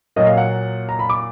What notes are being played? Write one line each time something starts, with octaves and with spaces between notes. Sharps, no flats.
A#2 F#3 A#3 D#5
F5
F#5
A#5
B5
D6